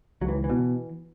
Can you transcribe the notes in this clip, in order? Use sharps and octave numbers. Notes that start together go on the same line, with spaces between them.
C#2 F#3
E3
E3
B2